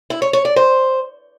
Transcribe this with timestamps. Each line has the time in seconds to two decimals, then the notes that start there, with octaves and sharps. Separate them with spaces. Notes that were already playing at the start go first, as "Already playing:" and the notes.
0.10 E4
0.22 C#5
0.33 C#5
0.45 D5
0.56 C5